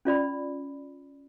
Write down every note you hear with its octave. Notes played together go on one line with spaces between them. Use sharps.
C#4 F4 D5 B5